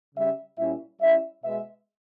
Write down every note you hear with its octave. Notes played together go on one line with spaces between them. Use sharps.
C#3 G3 C#4 E5
A#2 G3 C#4 E4 E5
G3 C#4 E4 E5
B2 G#3 B3 E5